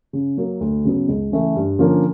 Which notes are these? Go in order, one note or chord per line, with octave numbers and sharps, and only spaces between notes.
C#3
F#3 A#3
D2
C#3 F#3 B3
C#2
C#3 E3 A3
G2
D3 F3 A#3 C#4